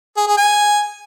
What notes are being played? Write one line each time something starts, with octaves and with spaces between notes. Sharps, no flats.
G#4
G#4
G#5